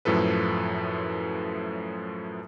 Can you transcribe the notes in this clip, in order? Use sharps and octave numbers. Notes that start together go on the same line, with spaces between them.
F#2 A2 F3 A4 B4